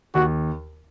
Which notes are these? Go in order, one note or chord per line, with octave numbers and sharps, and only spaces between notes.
D#2 F#4